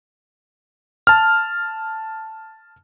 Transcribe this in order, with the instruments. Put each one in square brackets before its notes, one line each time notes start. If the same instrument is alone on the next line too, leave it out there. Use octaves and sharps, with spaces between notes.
[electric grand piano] A5 F6